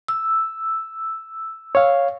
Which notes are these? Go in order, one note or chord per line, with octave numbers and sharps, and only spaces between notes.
E6
C#5 F5